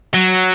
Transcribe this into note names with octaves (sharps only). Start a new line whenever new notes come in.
F#3